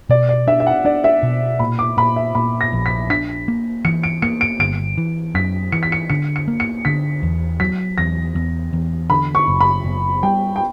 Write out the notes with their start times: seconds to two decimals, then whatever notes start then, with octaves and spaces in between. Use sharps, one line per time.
0.09 B2 D5
0.29 D5
0.47 D4 E5
0.60 E5
0.67 F#5
0.85 D4 D5
1.04 E5
1.23 B2
1.59 A#2 B5
1.79 D6
1.97 A#2 B5
2.16 E5
2.35 A#2 B5
2.61 A#6
2.73 A#1
2.86 B6
3.10 D4 B6
3.48 A#3
3.85 E3 C#7
4.03 D7
4.22 A#3 C#7
4.41 D7
4.60 G1 D7
4.98 E3
5.35 F#2 B6
5.72 E3 C#7
5.83 B6
5.92 C#7
6.10 D3 C#7
6.36 C#7
6.48 A#3
6.60 C#7
6.85 D3 B6
7.23 E2
7.60 F#3 B6
7.98 E2 A#6
8.35 E2
8.73 E2
9.10 D3 B5
9.35 C#6
9.48 F#1
9.61 B5
9.85 F#1
10.23 G3 G5
10.56 G5